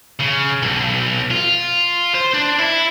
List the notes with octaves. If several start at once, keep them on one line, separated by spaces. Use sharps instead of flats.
C#3
B1
F4
C5
D4
E4